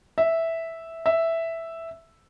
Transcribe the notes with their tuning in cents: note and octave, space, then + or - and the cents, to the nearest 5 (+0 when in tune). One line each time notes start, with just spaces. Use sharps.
E5 -5
E5 +0